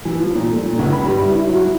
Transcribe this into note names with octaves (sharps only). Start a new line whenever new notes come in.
E3
F3
A#2
A3
A#2
C#2
B5
G2
E4
E4
F#3
E4